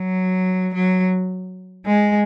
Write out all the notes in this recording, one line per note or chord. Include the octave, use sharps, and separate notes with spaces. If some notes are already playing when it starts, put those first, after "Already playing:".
Already playing: F#3
F#3
G#3